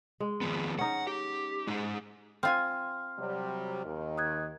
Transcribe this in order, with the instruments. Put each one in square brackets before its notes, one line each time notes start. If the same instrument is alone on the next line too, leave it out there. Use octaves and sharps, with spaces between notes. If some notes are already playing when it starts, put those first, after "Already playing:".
[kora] G#3
[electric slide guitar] D#3 F3 B3
[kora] C#4 D#4 [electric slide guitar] F#5
[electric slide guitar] G4
G#3 D#4
[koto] C4 F4 G#5 [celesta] C6 F6
[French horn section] C3 F#3 G3
D#2 D#3
[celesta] D#6 F#6 G#6